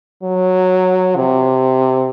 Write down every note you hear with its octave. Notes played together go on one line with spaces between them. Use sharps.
F#3
C3